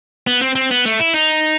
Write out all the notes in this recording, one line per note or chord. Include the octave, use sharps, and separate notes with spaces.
B3
C4
C4
B3
A3
E4
D#4